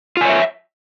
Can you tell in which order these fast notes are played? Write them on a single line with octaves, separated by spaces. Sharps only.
F4 G#5 C#5 E5